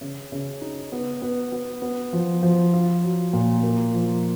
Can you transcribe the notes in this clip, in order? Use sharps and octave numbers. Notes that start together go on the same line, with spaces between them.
C#3
C#3
D#4
B3
B3
B3
B3
F3
F3
F4
F#3
A#2
A#3
F3